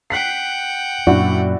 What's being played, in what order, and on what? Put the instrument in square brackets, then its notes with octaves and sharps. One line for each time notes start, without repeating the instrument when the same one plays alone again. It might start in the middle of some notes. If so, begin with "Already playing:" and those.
[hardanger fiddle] F#5 G5 [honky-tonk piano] F#6 B6 C7
[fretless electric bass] F#2 A#2 [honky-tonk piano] D4 E4 F#4